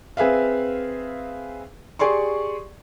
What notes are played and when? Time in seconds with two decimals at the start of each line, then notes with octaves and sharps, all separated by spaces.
0.17 C4 G#4 B4 E5 F5
1.99 G4 G#4 D5 C6 C#6